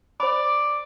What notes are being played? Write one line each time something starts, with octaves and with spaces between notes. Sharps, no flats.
C5 D5 B5